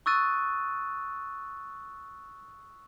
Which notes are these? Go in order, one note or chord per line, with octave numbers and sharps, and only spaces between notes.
C#6 D#6 E6 F#6 A6 D#7